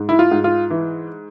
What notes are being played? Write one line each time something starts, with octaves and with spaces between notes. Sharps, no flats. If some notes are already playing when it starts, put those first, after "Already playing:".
Already playing: G#2
E4
F4
G#2
F4
E3